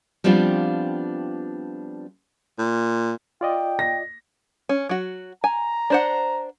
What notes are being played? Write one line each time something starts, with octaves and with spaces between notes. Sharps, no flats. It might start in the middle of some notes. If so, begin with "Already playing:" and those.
F3 G3 B3 C4 D4 F4
A#2
F4 D5 D#5 G5
A#6
C#4
F#3 F#4
G#5 A#5
D4 C5 F#5